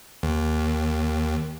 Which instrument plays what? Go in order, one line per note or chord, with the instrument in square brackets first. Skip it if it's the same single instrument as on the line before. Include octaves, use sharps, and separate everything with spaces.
[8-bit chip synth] D#2